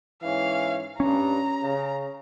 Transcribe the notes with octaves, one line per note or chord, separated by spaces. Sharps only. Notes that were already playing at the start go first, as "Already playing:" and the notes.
G#2 E3 C#4 F5
G2 C#4 A#5
C#3